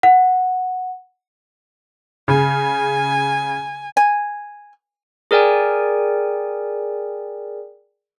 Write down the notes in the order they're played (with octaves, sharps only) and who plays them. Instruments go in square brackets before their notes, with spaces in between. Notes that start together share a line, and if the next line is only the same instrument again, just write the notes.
[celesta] F#5
[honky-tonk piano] C#3 [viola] G#5
[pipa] G#5
[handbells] G#4 A#4 D5 G5 G#5